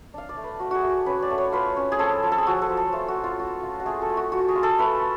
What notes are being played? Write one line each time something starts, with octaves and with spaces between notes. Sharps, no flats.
D4 F5
D5
A3
B4
A3 F#4
F#4 G#4
A3
C#4 B4
D5
A3
C#5
F4 B4
C#4
G#4
F3 A4
F3
A4
G#4
F3 F#4
A4
F3
A4
A3 F4
F#4
A3
F4
F4 F#4
F4
F#4
A3 G#4
A4
A3
F#4
F4 F#4
G#4
F4
A4
A3 B4